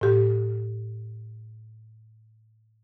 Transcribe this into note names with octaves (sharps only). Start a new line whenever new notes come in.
A2 G4